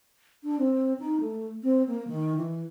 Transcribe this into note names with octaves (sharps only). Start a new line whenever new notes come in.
D4
C4
D#4
A3
C4
A#3
D#3
E3